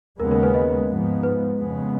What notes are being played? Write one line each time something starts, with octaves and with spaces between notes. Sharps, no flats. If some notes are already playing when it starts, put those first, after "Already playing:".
D#2 C#3 G#3 B3 A#4
A#4
B4
B4 D#5
G#2 F3 G#3 B3
B4
F2 C#3 G#3 B3